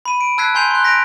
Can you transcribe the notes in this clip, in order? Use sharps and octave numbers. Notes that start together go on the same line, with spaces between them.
B5 D#7
D7
A5 E6 F#6 G#6 B6 C7
G#5 A#5 C6 G6 C7 F7
C6 F#6
F#6 A#6 B6 D7 F7